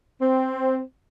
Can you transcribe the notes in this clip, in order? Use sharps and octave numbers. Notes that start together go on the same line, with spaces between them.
C4